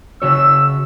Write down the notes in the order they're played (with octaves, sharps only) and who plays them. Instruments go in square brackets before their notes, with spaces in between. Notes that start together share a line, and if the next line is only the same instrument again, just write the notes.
[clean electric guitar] C#3 F#4 C#5 [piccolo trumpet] E6